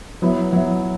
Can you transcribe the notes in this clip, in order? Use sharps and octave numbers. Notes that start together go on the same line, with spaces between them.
F#3 B3 E4
F#3 B3 E4